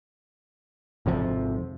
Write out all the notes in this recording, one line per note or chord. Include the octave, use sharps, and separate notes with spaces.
G#1 F2 C3 F3